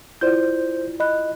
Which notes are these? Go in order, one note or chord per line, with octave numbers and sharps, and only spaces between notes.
E4 F4 C5 D5 G6
D#5 B5 F#6